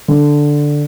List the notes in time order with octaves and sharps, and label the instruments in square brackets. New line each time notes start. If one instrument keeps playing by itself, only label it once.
[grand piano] D3